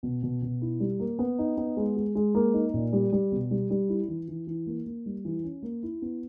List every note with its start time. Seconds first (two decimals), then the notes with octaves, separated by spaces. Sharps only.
0.03 B2
0.23 B2
0.42 B2
0.61 E4
0.80 G3
1.00 A#3
1.19 B3
1.39 D#4
1.57 B3
1.77 G#3
1.96 G#3
2.15 G#3
2.35 A#3
2.54 D#4
2.74 A#2
2.93 G3
3.12 G3
3.32 B2
3.51 G3
3.70 G3
3.89 E4
4.08 E3
4.28 E3
4.47 E3
4.67 A#3
4.86 A#3
5.06 G3
5.25 E3
5.44 C#4
5.63 A#3
5.83 E4
6.02 B3